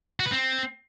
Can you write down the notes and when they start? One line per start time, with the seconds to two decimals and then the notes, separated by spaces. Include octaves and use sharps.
0.20 F#4
0.26 B4
0.32 C4